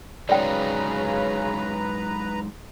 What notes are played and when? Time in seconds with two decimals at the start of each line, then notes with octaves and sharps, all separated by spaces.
0.29 C#3 F#3 G#3 D#4 B4 D5 G5 A#5